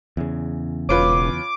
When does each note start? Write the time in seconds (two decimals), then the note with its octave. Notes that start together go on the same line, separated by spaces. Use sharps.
0.17 E2 C#3
0.89 E1 C#4 F4 B4 D6